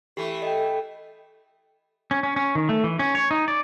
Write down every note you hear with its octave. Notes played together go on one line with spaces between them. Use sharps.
E3 A3 G4 A4
D#5 G5
C#4
C#4
C#4
D#3
A3
E3
C#4
C#5
D#4
D5